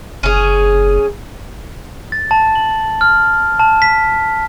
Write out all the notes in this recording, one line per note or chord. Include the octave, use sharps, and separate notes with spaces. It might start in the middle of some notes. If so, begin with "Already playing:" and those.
F#1 C#4 G#4
A6
A5
F#7
F6
A5
B6